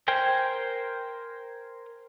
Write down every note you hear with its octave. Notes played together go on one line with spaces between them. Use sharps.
A#4 C5 G5 G#5